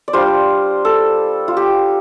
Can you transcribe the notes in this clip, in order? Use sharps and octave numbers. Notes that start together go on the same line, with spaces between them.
D5
G3 D4 F4 C5
A4
F4
G4